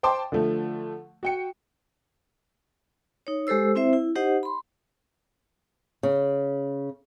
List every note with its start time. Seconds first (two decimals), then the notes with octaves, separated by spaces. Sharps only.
0.03 C5 G5 A5 C6 D6
0.32 D3 F3 A3
1.23 F#4 G5 C#7
3.27 D#4 C#5
3.47 G#3 G4 A4 C5 E6
3.75 C4 E4 C5 E5
3.93 E4
4.15 D#4 G4 C5 D#5 F#5
4.43 B5 C6
6.03 C#3